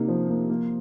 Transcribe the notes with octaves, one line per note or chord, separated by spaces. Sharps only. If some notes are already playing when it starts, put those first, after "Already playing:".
Already playing: C3 A#3 D#4
F3
A#3
A#3